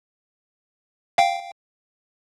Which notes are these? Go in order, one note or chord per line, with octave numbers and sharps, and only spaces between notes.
F5 G5